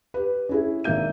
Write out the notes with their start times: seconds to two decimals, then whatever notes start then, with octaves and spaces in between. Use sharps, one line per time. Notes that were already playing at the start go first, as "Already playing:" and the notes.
0.14 G4 B4
0.49 C#4 E4 G#4
0.84 G#1 A#3 E5 G6 D#7